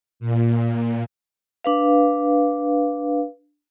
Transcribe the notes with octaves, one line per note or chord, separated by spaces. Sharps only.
A#2
D4 B4 F5